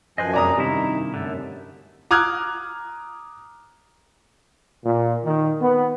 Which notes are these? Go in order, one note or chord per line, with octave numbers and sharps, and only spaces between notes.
F#2 F3 B4 C5 D#5 G#5
F2 B2 G#3 D5 A#5 D#6
G2 C3 D#3 D#4 E4
F#2 D3 A3
A#5 D6 D#6 F6 F#6 G#6
A#2
D#3
B3